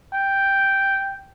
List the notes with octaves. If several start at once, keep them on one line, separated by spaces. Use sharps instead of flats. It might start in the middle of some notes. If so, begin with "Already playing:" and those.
G5